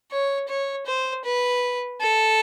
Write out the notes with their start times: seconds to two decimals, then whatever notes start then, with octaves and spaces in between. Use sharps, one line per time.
0.11 C#5
0.48 C#5
0.86 C5
1.24 B4
2.00 A4